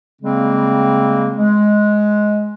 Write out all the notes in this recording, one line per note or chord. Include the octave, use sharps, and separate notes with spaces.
C#3 G3 G#3 A#3 C4
G#3